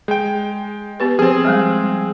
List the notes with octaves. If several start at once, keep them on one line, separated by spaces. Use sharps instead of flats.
G#3 G#4 G5
B3 G4 B4
F3 C4 G#4 C5
F3 G3 G#3